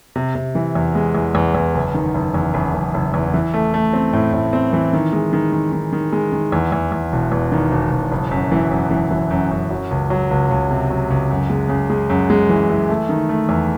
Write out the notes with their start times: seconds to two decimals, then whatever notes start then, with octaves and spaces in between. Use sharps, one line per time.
0.16 C3
0.35 C3
0.55 E3
0.75 E2
0.95 G#3
1.15 E2
1.35 E2
1.55 E2
1.74 F#1
1.94 D#3
2.15 F#1
2.34 E2
2.54 F#1
2.74 F#1
2.94 F#1
3.14 E2
3.34 E3
3.54 A3
3.74 A3
3.93 C4
4.13 A2
4.33 A2
4.53 C4
4.73 E3
4.93 D#3
5.13 G#3
5.33 D#3
5.52 D#3
5.72 D#3
5.92 D#3
6.12 G#3
6.32 D#3
6.52 E2
6.72 E2
6.92 E2
7.12 E1
7.32 E2
7.52 D#3
7.72 E1
7.92 E1
8.11 F#1
8.31 F#2
8.52 E3
8.71 F#2
8.91 E3
9.11 E3
9.31 F#2
9.51 F#2
9.70 F#3
9.91 C#2
10.10 F#3
10.30 C#2
10.50 C#2
10.70 C3
10.90 F#3
11.10 C#2
11.30 F#2
11.50 G#3
11.69 C#3
11.90 G#3
12.10 F#2
12.30 G#3
12.49 E3
12.69 E3
12.89 A3
13.09 D#3
13.29 A3
13.49 E2